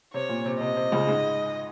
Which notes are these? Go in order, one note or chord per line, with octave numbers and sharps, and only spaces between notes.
C3 C#5
A#2
C3
C3 D#5
C3
C#2 C#3
G#2 G#3